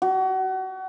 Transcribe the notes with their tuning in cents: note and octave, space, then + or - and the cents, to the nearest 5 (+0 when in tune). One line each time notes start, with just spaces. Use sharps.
F#4 +30